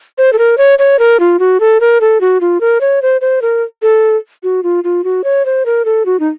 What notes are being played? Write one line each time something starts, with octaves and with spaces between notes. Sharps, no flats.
C5
A4
A#4
C#5
C#5
A#4
F4
F#4
A4
A#4
A4
F#4
F4
A#4
C#5
C5
C5
A#4
A4
F#4
F4
F4
F#4
C#5
C5
A#4
A4
F#4
D#4